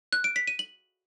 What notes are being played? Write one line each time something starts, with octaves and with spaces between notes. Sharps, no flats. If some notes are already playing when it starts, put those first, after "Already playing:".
F#6
D7
B6
D#7
F#7